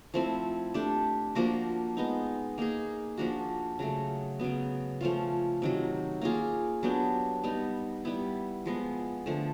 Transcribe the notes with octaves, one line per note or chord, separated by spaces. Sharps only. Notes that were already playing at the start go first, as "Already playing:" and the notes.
F3 A3 C4 E4
A3 D4 G4
F3 A#3 D4 F#4
G#3 B3 D#4
A#3 D#4 G#4
F3 A#3 D4 F#4
C#3 F#3 A3
C#3 F#3 B3
F3 A3 C#4 F4
C3 D#3 F#3
A#3 C#4 F4 G#4
F#3 B3 D4 G4
G3 B3 D#4
G3 B3 E4
F3 G#3 B3
D3 F3 A3